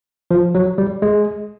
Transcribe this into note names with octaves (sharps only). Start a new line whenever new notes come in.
F3
F#3
G3
G#3